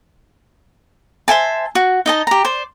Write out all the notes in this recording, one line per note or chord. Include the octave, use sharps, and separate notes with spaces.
C5 E5 G#5 A5
F#4
D#4 D#5 A5
G4 A#5
C5 D5